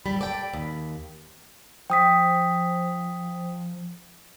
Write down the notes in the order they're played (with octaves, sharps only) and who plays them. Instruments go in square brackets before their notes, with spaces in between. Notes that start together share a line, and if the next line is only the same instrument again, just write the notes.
[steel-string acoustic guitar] G#2 G3 [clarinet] B5
[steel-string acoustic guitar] A4 D5 G5
D#2
[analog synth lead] F3 [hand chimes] G5 D#6 B6